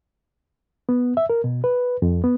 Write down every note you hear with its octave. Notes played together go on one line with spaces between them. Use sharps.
B3
E5
A#4
B2
B4
F2
B3